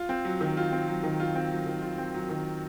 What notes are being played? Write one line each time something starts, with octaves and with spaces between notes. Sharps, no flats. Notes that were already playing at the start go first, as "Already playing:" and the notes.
Already playing: F4
C4
F#3
D#3
F4
C4
F#3
D#3
F4
C4
F#3
D#3
F4
C4
F#3
D#3